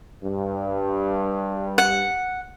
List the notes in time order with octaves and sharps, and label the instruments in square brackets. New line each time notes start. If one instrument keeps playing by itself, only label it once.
[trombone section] G2
[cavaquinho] F#5